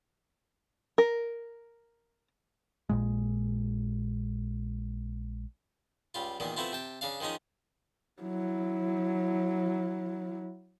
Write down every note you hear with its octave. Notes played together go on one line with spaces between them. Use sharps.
A#4
A#1 A#2 G#3
C#2 G3 F4
E2 A#2 D#3 A#3
A3 B3 C4 E4 F4
C3 G5 A5
C#3 D4 F5
D#3 F3 G#3 C#4 D#4
F#3 E4